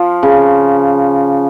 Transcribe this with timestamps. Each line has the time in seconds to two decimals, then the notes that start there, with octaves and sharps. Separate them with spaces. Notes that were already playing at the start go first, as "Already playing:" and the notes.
Already playing: F3
0.23 C#3